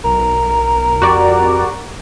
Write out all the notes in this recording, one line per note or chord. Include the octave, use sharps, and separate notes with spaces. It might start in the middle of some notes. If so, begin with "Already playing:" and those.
B1 A#4
F2 F#4 G4 D5